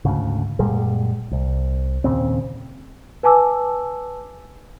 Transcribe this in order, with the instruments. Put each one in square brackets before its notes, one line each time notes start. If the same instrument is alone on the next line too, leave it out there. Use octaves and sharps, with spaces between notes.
[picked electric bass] D2 G#2 C#3
F#2 A#2 G3 G#3
C2
D#2 A#2 C#3 C4
[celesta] B4 G#5 A5 D6 E6